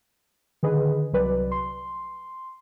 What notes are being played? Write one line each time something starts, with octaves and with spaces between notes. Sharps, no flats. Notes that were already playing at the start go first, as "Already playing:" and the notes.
D3 D#3 G#4 B4 D#5
C2 F#3 B4 D5
C6